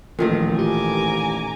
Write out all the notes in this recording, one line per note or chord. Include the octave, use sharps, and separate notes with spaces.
A1 A#2 D#3 F3 A3
G4 G#5 A#5 D6